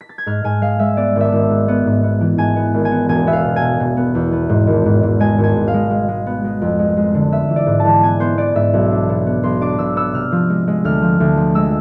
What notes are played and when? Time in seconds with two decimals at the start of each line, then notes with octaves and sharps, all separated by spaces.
0.01 B6
0.09 A6
0.18 G#6
0.26 G#2 F6
0.44 G#2 G#5
0.62 G#3 F5
0.79 G#3 E5
0.97 B3 D5
1.16 G#1 E5
1.32 G#1
1.50 G#2
1.68 B3
1.86 G#2
2.03 B3
2.21 E3
2.38 G#2 G#5
2.56 B3
2.74 G#1
2.85 G#5
2.91 B3
3.09 E1 G#5
3.27 B3 E5
3.33 F5
3.44 B2
3.56 G#5
3.62 B2
3.80 B2
3.97 B3
4.15 E2
4.32 B3
4.49 G#2
4.67 G#1
4.86 G#2
5.03 G#2
5.20 G#3 G#5
5.38 G#1
5.44 G#5
5.56 G#2
5.68 F5
5.74 G#3
5.90 G#3
6.08 G#3
6.27 B3
6.44 G#3
6.62 F2
6.79 G#3
6.97 G#3
7.14 D3
7.32 B3 E5
7.49 E3
7.56 D5
7.67 G#2
7.80 E3 A5
8.03 B3 G#5
8.20 B3 C5
8.37 B3 D5
8.55 G#2 E5
8.74 B1
8.91 D4
9.09 B2
9.26 B3
9.43 B1 C6
9.61 D4 D6
9.79 B1 E6
9.96 B3 E6
10.14 C3 F6
10.32 F3
10.50 G#3
10.68 G#3
10.84 D2 F6
11.02 F3
11.20 D2
11.37 F3
11.55 G#3 E6